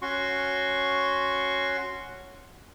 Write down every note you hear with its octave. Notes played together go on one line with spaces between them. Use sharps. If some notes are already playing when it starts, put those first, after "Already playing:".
C#4 F#4 C6 C#6